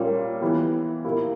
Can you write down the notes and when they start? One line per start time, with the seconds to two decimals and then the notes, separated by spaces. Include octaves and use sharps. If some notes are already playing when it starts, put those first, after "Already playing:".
Already playing: A#2 G3 A#3 C#4
0.41 E3 B3 E4 G4
1.05 A#2 A#3 E4 G4